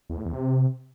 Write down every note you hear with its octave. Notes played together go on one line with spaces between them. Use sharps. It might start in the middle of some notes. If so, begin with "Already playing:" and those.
E2
A2
E2
C3